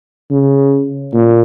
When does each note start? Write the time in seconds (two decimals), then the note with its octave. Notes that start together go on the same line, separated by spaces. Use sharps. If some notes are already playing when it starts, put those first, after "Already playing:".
0.31 C#3
1.13 A#2